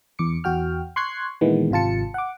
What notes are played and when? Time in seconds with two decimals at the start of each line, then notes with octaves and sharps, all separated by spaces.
0.19 E2 D6 C#7
0.44 E2 F#4 G5 F6
0.96 C6 C#6 F#6 G#6 C7
1.41 A#2 D#3 E3 G#3 B3
1.71 G#1 C3 F4 A5 C#7
2.14 F#5 D6